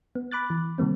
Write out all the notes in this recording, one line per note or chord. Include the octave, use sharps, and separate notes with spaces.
B3
B5 D6 F#6 A6
E3
C3 D#3 G3 A#3 C4